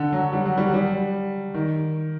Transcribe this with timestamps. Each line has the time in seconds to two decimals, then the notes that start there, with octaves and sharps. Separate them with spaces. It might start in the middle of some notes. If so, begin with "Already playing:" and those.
Already playing: D3
0.13 F#3
0.33 G3
0.46 F#3
0.58 G3
0.74 G3
1.54 D#3